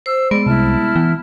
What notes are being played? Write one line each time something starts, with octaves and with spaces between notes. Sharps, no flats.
C5 E6
G#3 B3 D5
C2 E4 A5 F6
E3 B3